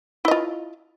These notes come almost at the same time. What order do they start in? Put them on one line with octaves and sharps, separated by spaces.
E4 D#5 F4